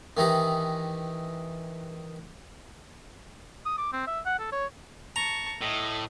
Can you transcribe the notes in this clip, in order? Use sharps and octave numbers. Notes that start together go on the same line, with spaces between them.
D#3 E3 D#4 G4
D#6
D6
C4
E5
F#5
A4
C#5
A5 A#5 C#6
A2 D#5